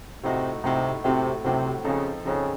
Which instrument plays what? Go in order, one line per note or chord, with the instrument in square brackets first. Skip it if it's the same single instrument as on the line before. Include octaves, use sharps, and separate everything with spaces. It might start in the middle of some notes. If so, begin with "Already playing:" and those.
[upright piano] A2 A3 D#4 F#4 [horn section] C3
[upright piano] A2 A3 D#4 F#4 [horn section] C3
[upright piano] A2 F#3 A3 C4 F#4 [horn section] C3
[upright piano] A2 F#3 A3 C4 F#4 [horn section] C3
[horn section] C#3 [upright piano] F3 C4 D#4 A4
[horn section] C#3 [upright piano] F3 C4 D#4 A4